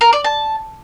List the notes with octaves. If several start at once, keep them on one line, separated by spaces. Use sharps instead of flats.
A#4
D5
A5